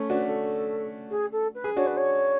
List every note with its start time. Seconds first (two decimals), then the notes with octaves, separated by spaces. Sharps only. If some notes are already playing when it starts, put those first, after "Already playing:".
Already playing: A3 C#4
0.10 D4 F#4 B4
0.27 A4
1.10 G#4
1.32 A4
1.55 B4
1.64 G#4
1.76 D4 F#4 C#5
1.86 B4
1.97 C#5